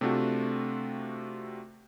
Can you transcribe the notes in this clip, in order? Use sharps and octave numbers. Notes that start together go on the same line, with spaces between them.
C3 A3 C4 D4 F4 F#4